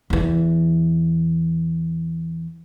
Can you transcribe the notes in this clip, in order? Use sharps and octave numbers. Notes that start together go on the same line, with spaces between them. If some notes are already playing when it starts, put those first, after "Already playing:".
E2 E3